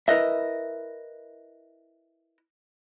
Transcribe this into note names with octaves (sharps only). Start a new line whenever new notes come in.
E4 A#4 B4 D#5 E5